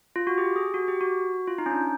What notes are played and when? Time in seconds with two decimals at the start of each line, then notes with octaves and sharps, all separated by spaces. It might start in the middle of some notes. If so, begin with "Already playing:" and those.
0.16 F4
0.27 F#4
0.38 G4
0.56 G#4
0.74 F#4
0.88 G4
1.01 F#4
1.47 F4
1.58 D#4
1.66 C#4
1.71 D4